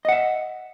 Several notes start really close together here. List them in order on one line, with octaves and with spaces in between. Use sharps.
D#5 F#5 E5